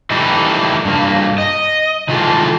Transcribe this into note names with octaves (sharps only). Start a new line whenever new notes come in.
D#3 E3 G3 A3 D#4 E4
G2 A#3
D#5
D#3 E3 G#3 F4 A4